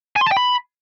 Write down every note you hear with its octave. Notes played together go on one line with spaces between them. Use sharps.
G#5
C6
A5
G5
B5